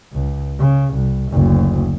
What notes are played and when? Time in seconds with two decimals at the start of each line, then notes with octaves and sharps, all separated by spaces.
0.12 C#2
0.59 C#3
0.94 C2
1.31 F#1 D2